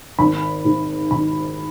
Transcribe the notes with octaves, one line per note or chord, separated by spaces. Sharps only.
G#1 B5
G#2
G#1 B5